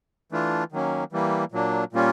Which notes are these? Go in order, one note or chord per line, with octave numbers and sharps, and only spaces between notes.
E3 A3 D4 F4
D#3 F#3 A#3 C#4
E3 G3 A#3
A#2 F#3 A#3 D4
A#2 G3 A#3 C#4 F4